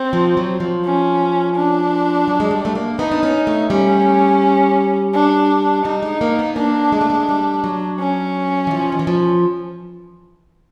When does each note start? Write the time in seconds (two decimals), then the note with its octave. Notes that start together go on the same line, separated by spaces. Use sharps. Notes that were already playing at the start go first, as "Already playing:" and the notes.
Already playing: C4
0.13 F3
0.37 F#3
0.60 F3
0.85 C#4
1.56 D4
2.28 F#3
2.40 G#3
2.51 G3
2.65 A3
2.75 A#3
2.99 B3 D#4
3.12 D4
3.23 C#4
3.47 A3
3.70 G3 C#4
5.14 D4
5.85 G3 D#4
6.03 G#3
6.21 A#3
6.39 B3
6.56 A#3 D4
6.92 G#3
7.01 A3
7.10 G#3
7.29 G3
7.64 F#3
7.99 C#4
8.67 E3
8.71 F3
8.92 D#3
8.99 E3
9.07 F3